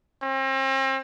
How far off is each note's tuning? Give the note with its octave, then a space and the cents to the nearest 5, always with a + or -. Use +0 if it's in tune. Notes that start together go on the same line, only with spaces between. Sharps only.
C4 +40